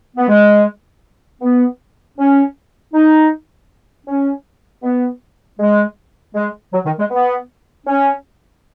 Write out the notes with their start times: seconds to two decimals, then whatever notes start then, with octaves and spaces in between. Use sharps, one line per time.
0.17 B3
0.29 G#3
1.42 B3
2.18 C#4
2.94 D#4
4.07 C#4
4.83 B3
5.59 G#3
6.35 G#3
6.73 F#3
6.85 D#3
6.98 G#3
7.11 B3
7.87 C#4